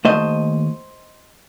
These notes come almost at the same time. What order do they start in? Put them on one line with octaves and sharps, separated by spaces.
D#3 A3 C5 D#5 D#2